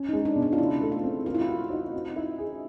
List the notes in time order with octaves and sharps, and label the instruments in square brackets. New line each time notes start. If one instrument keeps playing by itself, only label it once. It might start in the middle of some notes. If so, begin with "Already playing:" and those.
Already playing: [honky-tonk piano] C#4
[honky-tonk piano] G#3 [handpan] D#4
[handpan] D4
[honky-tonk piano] B2
[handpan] D4
F4
[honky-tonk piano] C#3 [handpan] E4
[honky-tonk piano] A3
[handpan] F4
[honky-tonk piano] C4
[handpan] F4 [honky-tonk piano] A#4
[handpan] E4
F4
[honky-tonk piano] F#4
D#4
C4
E4
G#4